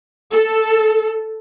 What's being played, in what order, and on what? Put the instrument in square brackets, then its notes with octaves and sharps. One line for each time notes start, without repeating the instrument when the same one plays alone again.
[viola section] A4